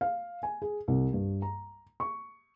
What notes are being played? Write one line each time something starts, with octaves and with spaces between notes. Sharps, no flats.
F5
G#5
G#4
C2
G2
A#5
C#6